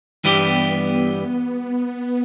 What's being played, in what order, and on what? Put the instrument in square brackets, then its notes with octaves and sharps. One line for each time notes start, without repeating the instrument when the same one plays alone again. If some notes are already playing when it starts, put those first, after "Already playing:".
[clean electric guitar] G2 E3 G3 E4 G4 [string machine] B3